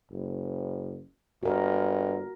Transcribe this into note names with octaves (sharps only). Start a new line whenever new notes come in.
F#1
G1 F#4 A#4